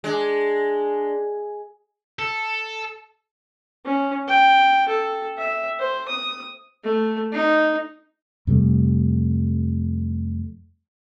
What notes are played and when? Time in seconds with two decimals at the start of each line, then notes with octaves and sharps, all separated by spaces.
0.04 G#3 D4
2.19 A4
3.86 C#4
4.28 G5
4.89 A4
5.38 E5
5.79 C5
6.08 D#6
6.84 A3
7.33 D#4
8.47 F2 C3 G3 A3